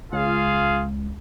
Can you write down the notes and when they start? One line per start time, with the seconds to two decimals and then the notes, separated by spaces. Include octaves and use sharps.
0.13 C#2 F4 G#4 F5